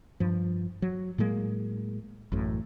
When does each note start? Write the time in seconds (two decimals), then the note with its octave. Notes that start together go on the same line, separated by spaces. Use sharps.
0.20 G2 F3
0.82 F#3
1.18 A2 F#3 G#3 A#3
2.32 A1 F#2 A2